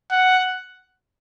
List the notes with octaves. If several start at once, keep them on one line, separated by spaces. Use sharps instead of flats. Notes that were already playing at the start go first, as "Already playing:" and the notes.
F#5